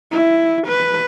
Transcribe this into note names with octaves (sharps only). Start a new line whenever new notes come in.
E4
B4